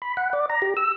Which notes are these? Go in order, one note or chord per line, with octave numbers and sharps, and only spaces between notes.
B5
F#5
D5
A#5
G4
E6